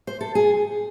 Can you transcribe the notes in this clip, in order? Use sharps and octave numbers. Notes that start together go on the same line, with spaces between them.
C5
A4
G#4